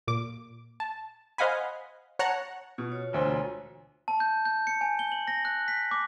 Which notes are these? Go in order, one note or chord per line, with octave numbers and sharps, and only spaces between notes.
A#2 D6
A5
C5 D#5 F5 F#5 G#5 B5
C#5 F#5 A5 A#5 F#6 C#7
B2 F4
F4 F#4 C#5
E1 D2 C5
A5
G6
G6
C#7
G#5
G7
F#7
A#6
F#6
B6
D6